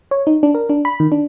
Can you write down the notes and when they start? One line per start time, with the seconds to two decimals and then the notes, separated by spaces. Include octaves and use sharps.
0.11 C#5
0.27 D#4
0.43 D4
0.55 A#4
0.69 D4
0.85 B5
1.00 D#3
1.12 D4